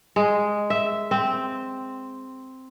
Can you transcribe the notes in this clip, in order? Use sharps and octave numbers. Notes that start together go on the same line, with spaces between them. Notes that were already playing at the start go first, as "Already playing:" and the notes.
G#3
E5
C4